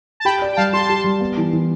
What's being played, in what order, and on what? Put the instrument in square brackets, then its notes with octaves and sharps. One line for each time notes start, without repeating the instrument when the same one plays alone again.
[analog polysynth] A5
[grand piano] G4 [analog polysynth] G5 B5
[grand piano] D5
[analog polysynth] G5
[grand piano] G3 [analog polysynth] F5 A5
[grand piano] G4 [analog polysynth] A5 C6
[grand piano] G4
G3
B3
E3
E3